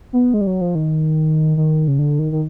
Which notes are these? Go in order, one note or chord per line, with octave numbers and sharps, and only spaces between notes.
B3
G#3
G3
F#3
F3
D#3
D#3
C#3
D3
D#3
D#3